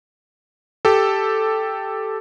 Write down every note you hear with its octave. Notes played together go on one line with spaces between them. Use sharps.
G4 A4